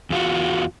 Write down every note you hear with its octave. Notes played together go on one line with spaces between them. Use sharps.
E2 F4 F#4